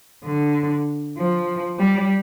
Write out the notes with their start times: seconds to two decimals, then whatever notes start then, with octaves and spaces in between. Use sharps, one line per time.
0.24 D3
1.18 F3
1.79 G3